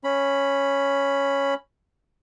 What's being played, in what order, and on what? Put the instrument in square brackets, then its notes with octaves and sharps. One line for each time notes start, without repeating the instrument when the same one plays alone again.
[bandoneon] C#4 B5